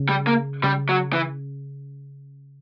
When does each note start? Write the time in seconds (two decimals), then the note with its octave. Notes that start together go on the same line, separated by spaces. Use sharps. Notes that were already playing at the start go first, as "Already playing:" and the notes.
Already playing: C#3
0.09 G3
0.27 A#3
0.63 C#3 G3
0.89 F#3
1.13 E3